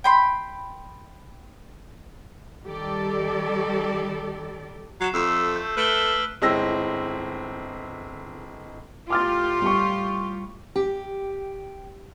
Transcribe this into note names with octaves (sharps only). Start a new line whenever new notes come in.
G5 B5 C6
D#3 G3 G4 A4 D5
F#3 C7 E7
F2 A3 E6 C7 E7
G6
A3 B4 F6 D7 G7
G1 G#3 C4 E4 E6 A#6
A2 F4 G4 D6 F6 A6
G3 C#6
G4